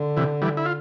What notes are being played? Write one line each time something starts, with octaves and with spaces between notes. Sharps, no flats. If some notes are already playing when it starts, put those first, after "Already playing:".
Already playing: D3
C3 E3
E3 G3
E4
F4